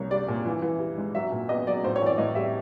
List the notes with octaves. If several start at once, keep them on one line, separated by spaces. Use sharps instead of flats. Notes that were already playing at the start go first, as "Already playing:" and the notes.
Already playing: C2 A#3 C#5
G3 D5
A#2
E3
E3
G3
G#2
F#3 E5
A#2
B3 D#5
F#3 D5
A2 C5
C#5
E3 D5
A2 D#5
G3 E5